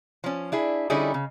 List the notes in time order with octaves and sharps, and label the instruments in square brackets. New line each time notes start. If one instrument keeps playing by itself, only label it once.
[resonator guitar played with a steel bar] F3 C#4
D4 E4 G#4
D3 G3 C#4 D#4 E4 G#4
C#3